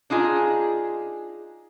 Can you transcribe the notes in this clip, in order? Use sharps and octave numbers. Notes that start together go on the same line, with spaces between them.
D4 D#4 F4 G#4